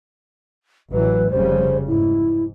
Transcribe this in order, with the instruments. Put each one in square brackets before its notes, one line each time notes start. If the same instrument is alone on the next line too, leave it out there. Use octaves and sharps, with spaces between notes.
[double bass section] A1 E3 F#3 [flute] B4
[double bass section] F1 C#3 G3 [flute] C5
[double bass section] G#2 [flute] E4